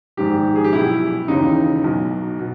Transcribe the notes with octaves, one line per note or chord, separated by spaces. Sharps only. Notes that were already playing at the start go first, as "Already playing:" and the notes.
A#1 G#2 D#3 G4
G#4
G4
B1 B2 E4
D#2 C#3 E3 D#4
B1 B2
B2